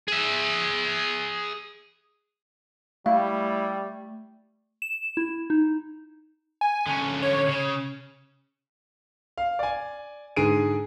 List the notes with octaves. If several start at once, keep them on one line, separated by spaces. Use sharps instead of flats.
G#4 E5
G3 A3 E4 F5
E7
E4
D#4
G#5
D3 C#4
C#5
C#3
F5
D5 G#5
G#2 D3 G#4 D7 D#7